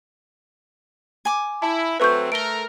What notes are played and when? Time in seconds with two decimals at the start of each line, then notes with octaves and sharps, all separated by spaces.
1.25 G#5 D6
1.62 E4 A5
2.00 F#3 A3 C4 B4 C#6 G6
2.32 A3 A#4 D7 G7